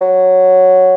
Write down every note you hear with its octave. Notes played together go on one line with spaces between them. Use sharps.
F#3